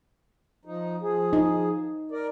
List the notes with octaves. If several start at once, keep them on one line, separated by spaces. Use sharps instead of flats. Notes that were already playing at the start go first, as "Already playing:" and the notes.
F3 D#4
F3 G#4
D#4
A#4 D5